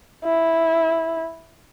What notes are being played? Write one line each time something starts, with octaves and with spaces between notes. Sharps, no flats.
E4